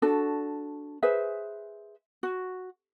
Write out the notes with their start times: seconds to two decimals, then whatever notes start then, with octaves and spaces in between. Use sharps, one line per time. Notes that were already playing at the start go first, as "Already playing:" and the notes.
0.02 D4 F#4 A4
1.03 G#4 B4 C5 E5
2.23 F#4